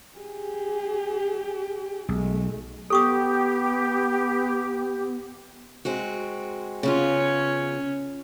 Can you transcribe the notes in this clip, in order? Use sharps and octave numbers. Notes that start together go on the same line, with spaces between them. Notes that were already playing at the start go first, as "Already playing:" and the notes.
G4 G#4
B1 G#3 A3
B3 G4 A4 C#6 D#6
G#3 C4 F#4
C#3 B3 C#4 F4 C#5